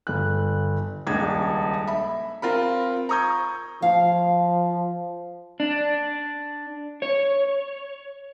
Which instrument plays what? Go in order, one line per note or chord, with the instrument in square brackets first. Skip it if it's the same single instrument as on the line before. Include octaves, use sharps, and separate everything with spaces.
[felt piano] G1 F#6
D#1 C#2 D4 G#6
E5 B5
C4 F4 A#4 B5
A#5 C#6 D#6 G6 G#6
[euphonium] F3 [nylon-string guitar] F5
[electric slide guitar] D4
C#5